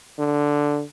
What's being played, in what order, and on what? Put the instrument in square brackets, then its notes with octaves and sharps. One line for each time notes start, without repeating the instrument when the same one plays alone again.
[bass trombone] D3